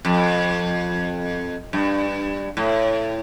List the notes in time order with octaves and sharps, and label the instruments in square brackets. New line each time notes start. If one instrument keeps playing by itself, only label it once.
[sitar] F2
G2
A2